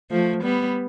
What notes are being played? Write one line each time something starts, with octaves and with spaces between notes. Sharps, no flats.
F3 A3
G3 B3